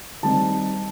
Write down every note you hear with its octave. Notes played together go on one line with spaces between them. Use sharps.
D#3 G3 C4 D#4 A5